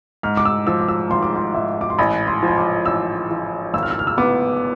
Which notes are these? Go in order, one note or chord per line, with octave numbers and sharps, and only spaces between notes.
G#2 F6
D6
E6
F3 E6
D6
E6
G#1 C6
D6
C6
G#2 E5
D6
C6
A1 B5
C6
F3 C6
D6
A1 E6
F3
G#1 E6
F6
E6
F6
E6
B3 D6